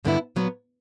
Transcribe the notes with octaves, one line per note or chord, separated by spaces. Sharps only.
G2 D3 G3 B3 E4
A#2 F#3 B3